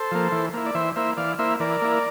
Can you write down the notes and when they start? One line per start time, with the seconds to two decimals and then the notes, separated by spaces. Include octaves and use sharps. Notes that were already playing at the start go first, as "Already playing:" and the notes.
Already playing: A4 C5
0.11 F3 A#3
0.32 E3
0.54 A#3 E4
0.66 D5
0.75 E3 C5 E5
0.96 A#3 E4 C5 E5
1.17 E3 D5 F5
1.39 A#3 E4 C5 E5
1.60 E3 A#4 D5
1.82 A#3 E4